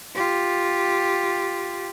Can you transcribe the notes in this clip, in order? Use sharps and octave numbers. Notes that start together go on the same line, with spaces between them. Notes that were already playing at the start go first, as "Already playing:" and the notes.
F4 G4